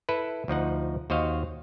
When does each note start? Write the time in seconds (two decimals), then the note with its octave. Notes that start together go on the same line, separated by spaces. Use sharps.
0.09 E4 A4 B4
0.48 D2 F3 D#4 F#5
1.10 D#2 F#4 C5 D#5 F5